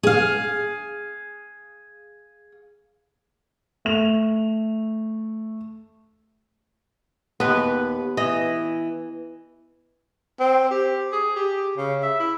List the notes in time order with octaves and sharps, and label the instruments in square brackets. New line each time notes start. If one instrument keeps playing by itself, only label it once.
[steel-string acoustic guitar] G#4 F5
[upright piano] A3 F7
[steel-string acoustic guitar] D#2 [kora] B3 B4
[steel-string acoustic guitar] E3 [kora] D#5
[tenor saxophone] C4
G4
G#4
G4
C#3
E5
E4